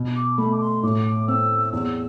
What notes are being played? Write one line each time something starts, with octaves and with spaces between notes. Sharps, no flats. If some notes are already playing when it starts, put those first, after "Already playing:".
Already playing: B2
D6
A3 B5
D6
C6
A2 D6
C4 E6
E2 E6